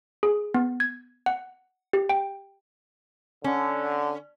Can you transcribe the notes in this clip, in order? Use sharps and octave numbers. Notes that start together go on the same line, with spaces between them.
G#4
B3
G#6
F#5
G4
G5
D3 C#4